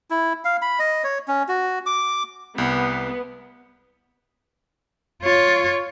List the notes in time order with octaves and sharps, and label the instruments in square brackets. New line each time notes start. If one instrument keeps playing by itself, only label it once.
[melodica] E4
F5
B5
D#5
C#5
C#4
F#4
D6
[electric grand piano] C2 [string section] B3
[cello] F4 C#5